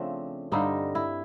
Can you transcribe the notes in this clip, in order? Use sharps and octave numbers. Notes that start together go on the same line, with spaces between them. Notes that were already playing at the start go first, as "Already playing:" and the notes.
Already playing: C#3 F3 A3 C4 D4
G2 D3 G3 C4 D#4
E4